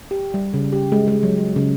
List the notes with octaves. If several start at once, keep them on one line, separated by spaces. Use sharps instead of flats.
G4
G3
C#3
G4
G#3
G#3
F#3
C#3